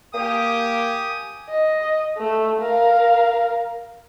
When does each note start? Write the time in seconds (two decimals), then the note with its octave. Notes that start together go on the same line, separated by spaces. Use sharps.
0.14 A#3 G4 G#5 D#6
1.50 D#5
2.18 A3
2.62 A#4 F5